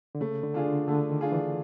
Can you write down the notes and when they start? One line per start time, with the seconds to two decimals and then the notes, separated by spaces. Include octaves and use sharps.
0.15 D3
0.21 C#3 A3
0.43 D3
0.54 D4 F4 G#4
0.66 D3
0.88 D3 A3
1.10 D#3
1.21 D4 F4 G#4
1.32 E3